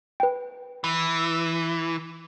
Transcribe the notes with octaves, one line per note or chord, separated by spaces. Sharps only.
B4 G5
E3